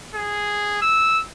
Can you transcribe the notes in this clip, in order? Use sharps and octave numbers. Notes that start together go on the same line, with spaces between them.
G#4
E6